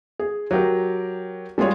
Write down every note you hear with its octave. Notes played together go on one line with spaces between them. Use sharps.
G#4
F#3 G4 A#4
G3 G#3 F4 G#4 C#5